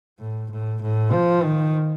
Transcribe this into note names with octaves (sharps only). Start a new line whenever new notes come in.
A2
A2
A2
F3
D#3